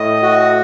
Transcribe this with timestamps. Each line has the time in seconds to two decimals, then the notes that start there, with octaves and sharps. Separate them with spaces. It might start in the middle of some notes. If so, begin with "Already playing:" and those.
Already playing: A2 D#5
0.23 F#4